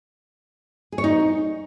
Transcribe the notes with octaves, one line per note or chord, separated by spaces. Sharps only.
G#4
C#5
D#4